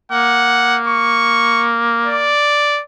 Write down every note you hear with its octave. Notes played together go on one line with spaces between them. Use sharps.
A#3 F#5
C#6
D5